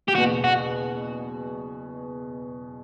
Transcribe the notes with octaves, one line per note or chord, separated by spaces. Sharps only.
G4
F#1 E2 B2 F#4
F#4